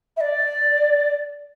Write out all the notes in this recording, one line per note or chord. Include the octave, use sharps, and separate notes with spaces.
E5
D5